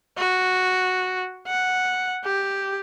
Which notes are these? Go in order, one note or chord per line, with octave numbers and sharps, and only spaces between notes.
F#4
F#5
G4